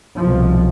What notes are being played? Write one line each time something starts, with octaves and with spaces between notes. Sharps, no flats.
C2 B2 F3